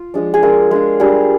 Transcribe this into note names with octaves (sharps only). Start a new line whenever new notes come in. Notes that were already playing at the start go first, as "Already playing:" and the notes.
Already playing: F4
F3 G#3 D4
G#4
G#3 D4 F4 A#4
G#3 D4 F4
G3 D4 F4 G#4